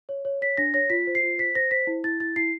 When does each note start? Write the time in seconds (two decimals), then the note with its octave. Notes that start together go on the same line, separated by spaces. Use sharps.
0.09 C#5
0.25 C#5
0.42 C#5 B6
0.57 D4 A#6
0.74 C#5 A#6
0.90 F4 B6
1.07 C5
1.15 C7
1.23 F4
1.38 C5 B6
1.55 C5 A#6
1.71 C5 B6
1.87 E4
2.04 E4 A6
2.20 E4 A6
2.36 E4 C7